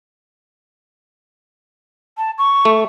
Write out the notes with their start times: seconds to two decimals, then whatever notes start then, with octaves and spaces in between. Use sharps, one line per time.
2.18 A5
2.38 C#6
2.65 A3